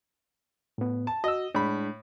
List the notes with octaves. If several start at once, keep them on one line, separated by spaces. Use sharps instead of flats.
A2 B3
A5
F#4 D#5 E6
A2 G#3 D4 B5